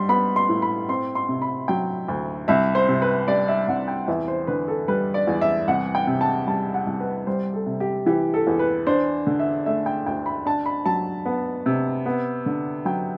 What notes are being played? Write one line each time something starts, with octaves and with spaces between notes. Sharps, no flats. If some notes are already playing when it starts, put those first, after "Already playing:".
Already playing: G3 C6
B3 B5
C6
A2
B5
C4 C6
C6
C3
B5
F#3 G5
D2
C2 E5
C5
C3
B4
G3 D5
E5
C2 F#5
G5
E2 E5
C5
D3 B4
A4
G3 B4
D5
E2
E5
C2 F#5
G5
C3
A5
G3 A5
F#5
C2
B4
G3 C5
A4
C3
G4
E3 G4
A4
E2
B4
D4 C5
D3
E5
A3 E5
G5
D2 G5
B5
D4 A5
B5
F#3 A5
B3
C3
B3
D3
F#3 G5